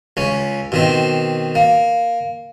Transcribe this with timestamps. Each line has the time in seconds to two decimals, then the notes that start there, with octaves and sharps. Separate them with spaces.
0.17 C#2 C#4
0.72 B2 D#3 C4
1.55 A#3